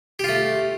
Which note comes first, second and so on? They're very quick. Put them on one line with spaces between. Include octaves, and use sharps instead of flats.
G4 F4 A3